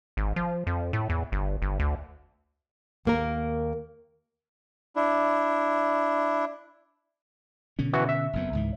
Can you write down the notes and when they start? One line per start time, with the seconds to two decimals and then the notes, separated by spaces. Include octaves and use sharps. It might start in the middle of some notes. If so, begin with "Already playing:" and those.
0.17 G#1
0.36 F3
0.67 F2
0.93 A2
1.10 E2
1.32 G1
1.62 G1
1.80 D2
3.05 D#2 A#3 A#4
4.96 D4 E4
7.79 B2 D3 C#4
7.93 E3 F#4
8.09 E5
8.33 F#1 F2 B3
8.53 C#2 G#2 E3